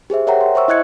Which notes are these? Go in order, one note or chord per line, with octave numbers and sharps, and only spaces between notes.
G4 G#4 C5 E5
A#4 C#5 E5 F#5 G5 A#5
C6
C5 E5 C#6 E6
E4 D#5 F#6 G#6 C#7